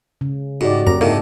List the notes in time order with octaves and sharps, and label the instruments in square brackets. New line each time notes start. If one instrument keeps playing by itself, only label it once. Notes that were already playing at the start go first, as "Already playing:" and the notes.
[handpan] C#3
[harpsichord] G#2 [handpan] F#4 G4 D5
[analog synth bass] F#2 [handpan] A#3 [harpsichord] A#5
[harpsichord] G#2 C3 [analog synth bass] A#3 [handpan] E4 A4